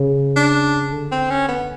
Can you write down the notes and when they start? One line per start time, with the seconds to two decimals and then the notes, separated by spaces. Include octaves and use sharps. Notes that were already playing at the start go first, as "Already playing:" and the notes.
Already playing: C#3
0.36 D4
0.92 D3
1.12 C4
1.30 C#4
1.48 B3